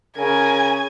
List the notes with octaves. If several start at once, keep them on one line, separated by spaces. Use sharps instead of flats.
C#3 A#4 G#5